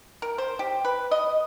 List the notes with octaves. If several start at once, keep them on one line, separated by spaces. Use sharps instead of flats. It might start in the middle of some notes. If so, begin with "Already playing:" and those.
A#4
C5
G4
B4
D#5